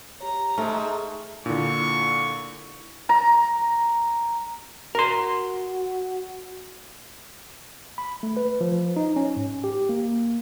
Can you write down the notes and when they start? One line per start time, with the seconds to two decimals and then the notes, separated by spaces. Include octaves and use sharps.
0.21 G4 C#5 A#5
0.58 G#2 A3 A5 C#6 F6
1.46 A#2 D3 D4 E4 C#6
3.09 A#5
4.95 F#4 A#4 C6
7.98 B5
8.23 A3
8.37 B4
8.61 F3
8.96 D#4
9.16 C#4
9.37 G#2
9.64 G4
9.89 A#3